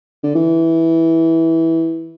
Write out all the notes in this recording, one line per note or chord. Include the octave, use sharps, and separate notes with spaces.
D3
E3